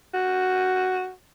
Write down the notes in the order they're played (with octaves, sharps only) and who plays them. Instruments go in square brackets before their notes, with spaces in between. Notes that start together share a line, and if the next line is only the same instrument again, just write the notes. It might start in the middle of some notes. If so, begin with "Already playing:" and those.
[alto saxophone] F#4